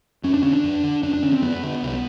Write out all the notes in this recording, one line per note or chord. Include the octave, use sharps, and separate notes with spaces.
F2 C#4
D4
D3 C#4
D4
F2
D3
F2 D4
D4
D3 C#4
C4
F2 B3
D3
C2